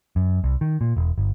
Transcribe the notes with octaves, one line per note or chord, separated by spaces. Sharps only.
F#2
C2
D#3
A#2
E1
G1